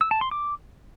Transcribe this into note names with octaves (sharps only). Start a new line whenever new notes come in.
E6
A5
C6
D6